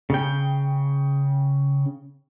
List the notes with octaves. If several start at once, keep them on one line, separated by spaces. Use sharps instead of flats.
C#3 G5